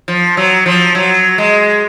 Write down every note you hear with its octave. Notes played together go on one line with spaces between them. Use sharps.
F3
F#3
F3
F#3
G#3